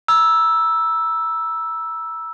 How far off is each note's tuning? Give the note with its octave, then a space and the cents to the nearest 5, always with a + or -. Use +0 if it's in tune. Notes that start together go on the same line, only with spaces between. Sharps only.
A#5 +35 E6 +0